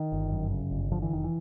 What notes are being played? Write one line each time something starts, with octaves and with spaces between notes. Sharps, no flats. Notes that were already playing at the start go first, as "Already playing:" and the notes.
Already playing: D#3
G1
F#2
C#3
G1
D3 F3
E3
F1 D#3
E3